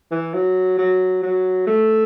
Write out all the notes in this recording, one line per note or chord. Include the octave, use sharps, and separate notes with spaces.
E3
F#3
F#3
F#3
A3